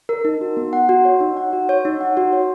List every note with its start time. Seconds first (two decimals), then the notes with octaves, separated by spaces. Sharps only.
0.09 A#4
0.25 D#4
0.41 F#4
0.57 B3
0.73 F#5
0.89 F#4
1.05 C#5
1.20 D#4
1.37 F#5
1.53 F#4
1.69 C#5
1.85 D#4
2.01 F#5
2.17 F#4
2.33 C#5